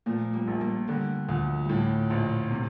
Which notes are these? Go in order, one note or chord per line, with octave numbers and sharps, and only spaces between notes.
A#2 F3 A3
G3 A#3
A#1
G3 A#3
D3 G3 A#3
D2 F3 A3
A2 F3 G3
A#1
C3